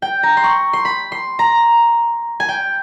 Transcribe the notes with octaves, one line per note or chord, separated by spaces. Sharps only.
G5
A#5
C6
C#6
C6
B5
C6
A#5
G#5
G5